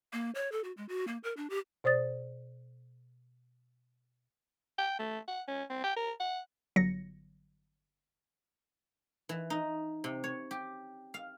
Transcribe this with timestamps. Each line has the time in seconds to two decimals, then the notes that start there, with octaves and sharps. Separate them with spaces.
0.13 A#3
0.35 C#5
0.52 A4
0.64 F#4
0.77 G#3
0.89 F#4
1.08 A#3
1.24 A#4
1.37 D4
1.50 G4
1.84 B2 C5 D5 D#6 A6
4.78 G5
4.99 A3
5.28 F#5
5.48 C#4
5.70 C4
5.84 G5
5.96 A#4
6.20 F#5
6.76 G1 F#3 A#6 C#7
9.29 E3
9.50 D#4
10.04 C3
10.24 C#5
10.51 G4
11.14 F5